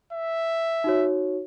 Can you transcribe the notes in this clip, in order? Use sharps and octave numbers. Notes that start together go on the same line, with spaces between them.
E5
D#4 F#4 C#5